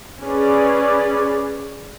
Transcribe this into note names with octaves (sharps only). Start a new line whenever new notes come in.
C#4 G#4 B4 D5